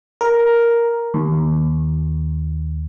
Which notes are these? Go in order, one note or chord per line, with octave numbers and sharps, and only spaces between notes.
A#4
D#2